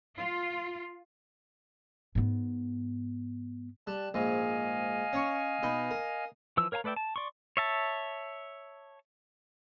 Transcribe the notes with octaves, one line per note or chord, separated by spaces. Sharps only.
F4
G#2 B3
G3 A5 F#6
A#1 G#2 D#5 F5 G#5
C#4 C#5 C#6
B2 D#4 B5
A#4
E3 F3 E6
A#4 C#5 F5 G#5 A#5
A3 B4 D5 E5 G5
A5
D5 C6 C#6
C#5 E5 A5